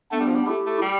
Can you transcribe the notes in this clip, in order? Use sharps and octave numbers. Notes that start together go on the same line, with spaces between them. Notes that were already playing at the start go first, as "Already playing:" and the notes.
A3 B3 D4
G3
F3
G3
A3 E4 G4
A3
G3